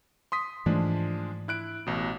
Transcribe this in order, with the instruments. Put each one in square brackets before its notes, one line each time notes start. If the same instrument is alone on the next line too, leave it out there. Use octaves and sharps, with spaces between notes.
[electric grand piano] C6 D#6 B6
[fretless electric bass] G#2 E3 A3 [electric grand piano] F3 G#3 D4
[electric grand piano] E4 F#6 D7
A1 B2